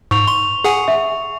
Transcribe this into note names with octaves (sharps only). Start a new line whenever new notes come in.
G#2 C#6 F7
C6
G#4 F#5 G#5
E5